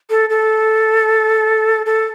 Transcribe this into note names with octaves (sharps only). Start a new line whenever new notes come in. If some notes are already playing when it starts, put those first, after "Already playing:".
A4
A4
A4